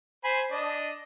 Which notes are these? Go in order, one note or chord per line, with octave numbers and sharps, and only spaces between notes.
C5 G#5 B5
D4 D#5